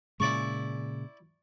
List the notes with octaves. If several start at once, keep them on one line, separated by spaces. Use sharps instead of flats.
A#2 C#3 G#3 E4 D5 C#6